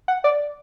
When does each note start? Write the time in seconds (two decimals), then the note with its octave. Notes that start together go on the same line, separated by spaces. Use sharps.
0.08 F#5
0.24 D5